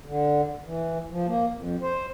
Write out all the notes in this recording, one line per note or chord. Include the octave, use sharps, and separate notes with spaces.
D3
E3
F3
A#3
F2
C5